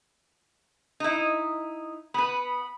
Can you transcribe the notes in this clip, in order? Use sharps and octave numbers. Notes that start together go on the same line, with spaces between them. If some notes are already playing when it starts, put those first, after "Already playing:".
D#4 E4
B3 B4 B5